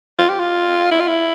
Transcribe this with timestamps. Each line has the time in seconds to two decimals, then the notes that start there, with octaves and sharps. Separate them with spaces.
0.19 F4
0.29 G4
0.40 F4
0.91 E4
1.00 F4
1.07 E4